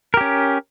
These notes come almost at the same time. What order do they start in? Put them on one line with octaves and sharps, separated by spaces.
A#4 G4 C#4